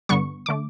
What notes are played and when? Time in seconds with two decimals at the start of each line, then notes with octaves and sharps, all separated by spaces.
0.09 G2 D3 G3 B3 C#6
0.46 D3 A3 D6